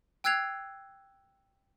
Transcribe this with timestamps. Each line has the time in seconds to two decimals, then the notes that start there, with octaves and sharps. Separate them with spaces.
0.24 G5 E6 F#6 G#6 C7 F7